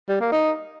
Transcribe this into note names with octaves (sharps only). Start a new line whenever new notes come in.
G3
A#3
D#4